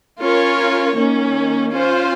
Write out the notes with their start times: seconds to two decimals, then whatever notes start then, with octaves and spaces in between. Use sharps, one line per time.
0.22 C#4 F4 A#4 C#5
0.97 D#3 A#3 C#4
1.72 C#4 F4 C5